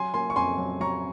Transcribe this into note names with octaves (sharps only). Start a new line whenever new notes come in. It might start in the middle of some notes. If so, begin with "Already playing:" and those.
Already playing: F#3 G#5 C6
A#3 G#5 C6
C#6
F2 G#5 C6
F#3
F#3 A#5 C#6